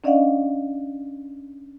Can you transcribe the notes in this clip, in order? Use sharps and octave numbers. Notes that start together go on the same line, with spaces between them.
C#4 D4 D5 D#5 F5 F#5